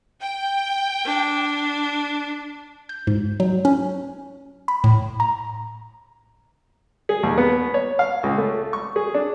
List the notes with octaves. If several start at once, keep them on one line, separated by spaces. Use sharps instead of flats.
G5
D4
G6
G#2
F#3
C#4
B5
A2
A#5
G#4
D#2
B3
C#5
F5
C#2
A3
C#6
G#4
D4